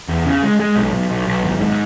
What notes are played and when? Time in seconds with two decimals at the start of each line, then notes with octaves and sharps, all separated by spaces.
0.08 E2
0.25 C#3
0.43 G#3
0.60 G#3
0.76 B1
0.93 B1
1.10 B1
1.27 B1
1.44 G#1
1.60 G#2